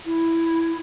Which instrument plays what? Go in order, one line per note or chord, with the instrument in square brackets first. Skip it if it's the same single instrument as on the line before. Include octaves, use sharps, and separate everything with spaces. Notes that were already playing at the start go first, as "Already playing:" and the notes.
[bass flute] E4